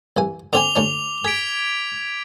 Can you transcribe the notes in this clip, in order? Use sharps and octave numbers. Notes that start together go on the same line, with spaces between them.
C2 E3 G#5
D3 C4 G#5 D6 F7 G7
D2 C#4 D4
G#4 G#6 B6 D7